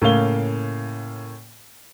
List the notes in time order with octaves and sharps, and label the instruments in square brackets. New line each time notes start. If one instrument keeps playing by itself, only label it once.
[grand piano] A2 C#3 A#3 F5 G7